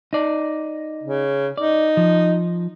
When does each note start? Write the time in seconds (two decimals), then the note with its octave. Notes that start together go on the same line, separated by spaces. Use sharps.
0.13 D#4 D5
1.03 C#3
1.57 D#4 D5
1.97 F3